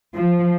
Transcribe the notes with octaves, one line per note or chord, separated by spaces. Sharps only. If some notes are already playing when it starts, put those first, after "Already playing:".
F3